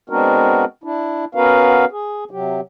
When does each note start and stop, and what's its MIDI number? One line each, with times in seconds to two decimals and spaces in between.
0.10 0.65 56
0.10 0.65 59
0.10 0.65 60
0.10 0.65 62
0.10 0.65 66
0.10 0.65 70
0.84 1.25 62
0.84 1.25 64
1.35 1.85 59
1.35 1.85 61
1.35 1.85 66
1.35 1.85 70
1.35 1.85 71
1.35 1.85 77
1.91 2.24 68
2.31 2.61 48
2.31 2.61 54
2.31 2.61 67